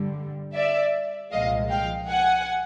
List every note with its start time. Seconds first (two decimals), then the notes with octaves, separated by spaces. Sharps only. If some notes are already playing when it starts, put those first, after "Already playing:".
Already playing: G2 D3 G3
0.54 D5 E5
1.32 C2 A#2 F3 G#3 D#5 F5
1.70 F5 G5
2.09 F#5 G#5